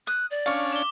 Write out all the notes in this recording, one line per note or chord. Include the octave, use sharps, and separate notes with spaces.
D#6 F#6
D5
C#4 D4 F5 C#6
D6 G7